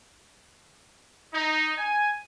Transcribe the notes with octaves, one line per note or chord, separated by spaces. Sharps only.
D#4
G#5